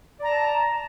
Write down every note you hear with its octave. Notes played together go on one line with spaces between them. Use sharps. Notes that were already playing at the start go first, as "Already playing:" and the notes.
D5 A5 A#5